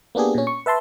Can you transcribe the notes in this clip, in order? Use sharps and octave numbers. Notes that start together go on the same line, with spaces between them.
A#3 B3 D4 G4 G#4
A#2 C#4
C#6
B4 E5 A5 C6